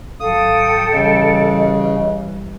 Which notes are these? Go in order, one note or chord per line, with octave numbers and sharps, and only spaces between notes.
G#1 F#3 A4 F5 G5 D#6
C#3 E3 G3 D#5